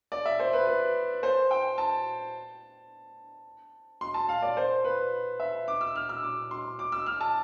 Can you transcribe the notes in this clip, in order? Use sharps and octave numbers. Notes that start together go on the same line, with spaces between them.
D5
E5
C5
B4
B4
C5
G5
A5
C6
A5
F5
D5
C5
B4
E5
D6
E6
F6
E6
D6
C6
D6
E6
F6
A5